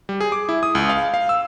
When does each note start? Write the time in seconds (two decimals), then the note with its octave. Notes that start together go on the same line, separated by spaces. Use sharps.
0.09 G3
0.21 G#4
0.32 D6
0.49 E4
0.63 D#6
0.75 C#2
0.89 F5
1.14 F5
1.29 E6